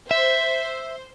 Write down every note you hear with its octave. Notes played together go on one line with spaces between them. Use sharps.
C5 E5